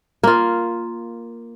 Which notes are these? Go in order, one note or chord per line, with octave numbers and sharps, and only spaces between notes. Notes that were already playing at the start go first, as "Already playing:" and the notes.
A#3 F4